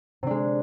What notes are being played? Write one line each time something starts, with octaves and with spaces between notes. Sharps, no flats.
C3 G#3 D4